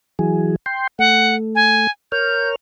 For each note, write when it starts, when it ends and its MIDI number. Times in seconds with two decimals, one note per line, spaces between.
0.19 0.56 52
0.19 0.56 54
0.19 0.56 68
0.66 0.87 79
0.66 0.87 84
0.99 1.87 57
0.99 1.35 78
1.55 1.90 80
2.12 2.56 70
2.12 2.56 73
2.12 2.56 89
2.12 2.49 91